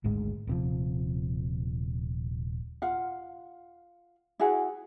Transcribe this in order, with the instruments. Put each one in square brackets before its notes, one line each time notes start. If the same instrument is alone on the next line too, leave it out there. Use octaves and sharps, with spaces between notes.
[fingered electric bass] G#1 D2 G#2 G#3
D#1 C3 F3
[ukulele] F4 F5 F#5
E4 F#4 G#4 F#5